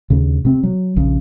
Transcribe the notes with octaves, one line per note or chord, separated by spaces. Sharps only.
D#2 C#3
C3 C4
F#3
A#1 C#3